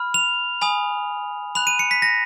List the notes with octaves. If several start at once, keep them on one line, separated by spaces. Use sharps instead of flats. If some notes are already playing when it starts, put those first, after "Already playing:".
Already playing: B5 F6
F7
G#5 B5 D#6
B5 F#6 F7
D#7
C#7
B6
A#6